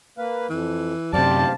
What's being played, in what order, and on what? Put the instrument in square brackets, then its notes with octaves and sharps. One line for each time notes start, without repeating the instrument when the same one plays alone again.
[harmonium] A#3 B4 F5
[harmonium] F2 [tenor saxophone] E3
[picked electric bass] F#2 C3 [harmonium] G4 C5 F5 [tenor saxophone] D5 [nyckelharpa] A5